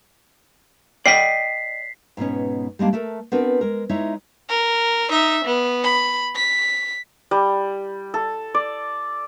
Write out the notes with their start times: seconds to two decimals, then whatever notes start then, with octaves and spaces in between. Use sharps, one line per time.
1.06 D5 D#5 G5 B6 C7
2.17 G#2 B2 B3 C#4
2.79 G3 G#3 A#3 D4
2.93 A3 A4 A#4
3.32 B3 C4 D4 F#4 A#4 B4
3.61 G#3 A#4
3.89 G#3 D#4 E4 C#5 E5
4.49 A#4
5.10 D#4 E5
5.45 B3
5.84 B5
6.35 B6
7.31 G3
8.14 A4
8.54 D5